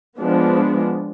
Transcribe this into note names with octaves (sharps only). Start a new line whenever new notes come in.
F3 G#3 B3 D4